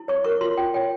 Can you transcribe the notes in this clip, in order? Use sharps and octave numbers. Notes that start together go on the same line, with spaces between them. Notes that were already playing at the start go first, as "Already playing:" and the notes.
Already playing: E4
C#5 C#6
A#4 C#6
F4 C6
F4 G5
C#5 G5